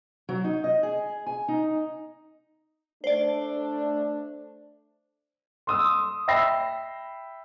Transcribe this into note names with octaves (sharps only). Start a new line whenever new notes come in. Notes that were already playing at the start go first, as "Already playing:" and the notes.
F#3
D#4
D#5
G#4
G#5
D#4
A3 D4 C5 D5
C6 D#6 E6
E5 G5 B5 E6 A#6 C7